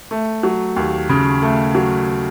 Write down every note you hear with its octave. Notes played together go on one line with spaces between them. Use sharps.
A3
F#3
D#2
C#3
A3
F#3